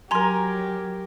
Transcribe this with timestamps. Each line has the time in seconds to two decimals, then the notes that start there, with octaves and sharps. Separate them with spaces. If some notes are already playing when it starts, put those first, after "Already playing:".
0.11 F#3 G4 A#4 G#5 A#5 C6